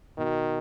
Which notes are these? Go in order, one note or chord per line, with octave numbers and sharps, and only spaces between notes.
B2 D#3